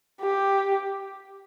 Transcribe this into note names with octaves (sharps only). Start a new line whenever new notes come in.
G4